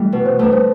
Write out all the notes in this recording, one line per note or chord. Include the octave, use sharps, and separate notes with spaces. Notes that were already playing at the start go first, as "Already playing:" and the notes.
Already playing: E3 G3 A3
B2 B4
C5
A3 D4 B4
C5